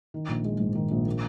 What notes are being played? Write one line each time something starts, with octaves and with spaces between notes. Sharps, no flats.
D#3
A#1
G#3
G#2
D#3
A#1
A#3